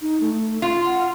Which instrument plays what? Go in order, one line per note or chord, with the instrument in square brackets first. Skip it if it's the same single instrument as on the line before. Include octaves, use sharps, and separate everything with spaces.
[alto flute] D#4
A3
[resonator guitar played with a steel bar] F4 [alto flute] C6
[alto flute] F#5